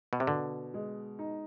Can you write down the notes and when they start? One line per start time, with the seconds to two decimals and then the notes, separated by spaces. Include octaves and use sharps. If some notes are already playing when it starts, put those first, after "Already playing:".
0.13 B2
0.20 C3
0.27 B2 D3
0.74 G#3
1.19 D#4